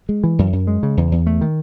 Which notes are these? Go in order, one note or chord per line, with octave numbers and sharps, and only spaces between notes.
G#3
E3
F#2
F#2
G#3
C#3
E2
E2
A3
D#3